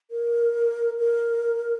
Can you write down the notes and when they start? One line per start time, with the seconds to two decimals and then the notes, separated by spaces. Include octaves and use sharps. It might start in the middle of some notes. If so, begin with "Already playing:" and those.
0.11 A#4
0.99 A#4